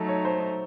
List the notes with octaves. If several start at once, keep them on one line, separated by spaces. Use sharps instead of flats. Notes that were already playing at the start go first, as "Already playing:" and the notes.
Already playing: F#3 A3 D#4 A4
C#5
C5